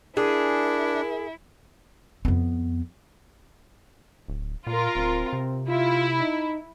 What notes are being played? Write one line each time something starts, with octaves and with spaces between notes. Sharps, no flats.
D4 E4 G#4 A#4
F2 B3
D1
A#2 F4 A#4
D1 C4
C3
E4 F4
D#4